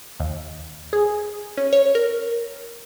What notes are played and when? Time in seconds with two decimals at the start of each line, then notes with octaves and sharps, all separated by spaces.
0.20 D#2
0.93 G#4
1.57 C#4
1.73 C#5
1.95 A#4